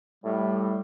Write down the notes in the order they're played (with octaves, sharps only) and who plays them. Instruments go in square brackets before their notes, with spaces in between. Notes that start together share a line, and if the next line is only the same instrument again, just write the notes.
[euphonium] A2 [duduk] G3